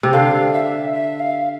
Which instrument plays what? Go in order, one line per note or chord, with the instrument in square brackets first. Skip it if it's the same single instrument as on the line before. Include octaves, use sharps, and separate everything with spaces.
[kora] C3
[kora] D3 [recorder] F5
[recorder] E5
E5
F5